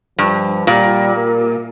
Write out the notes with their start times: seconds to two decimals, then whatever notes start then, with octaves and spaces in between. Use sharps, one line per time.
0.19 G2 F3
0.67 A#2 G3
1.16 A#3